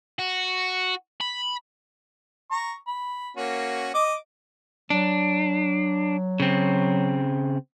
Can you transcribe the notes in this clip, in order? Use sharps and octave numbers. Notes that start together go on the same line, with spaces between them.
F#4
B5
A#5 C#6
B5
A#3 C#4 F#4
D#5 D6
F#3 D4
C#3 C4